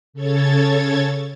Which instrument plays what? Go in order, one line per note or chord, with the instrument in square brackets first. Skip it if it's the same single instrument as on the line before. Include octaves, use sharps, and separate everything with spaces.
[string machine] C#3 A4 C#5 G#6 A6